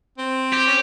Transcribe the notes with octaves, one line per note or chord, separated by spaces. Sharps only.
C4
G4
C#4